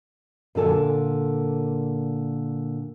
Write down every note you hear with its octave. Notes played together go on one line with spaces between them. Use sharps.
A#2 D3 A4 G#5